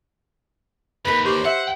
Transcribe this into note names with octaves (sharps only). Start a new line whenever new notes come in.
D#2 A#4 B4 B5
G4 C5 C#6 D6
E5 F#5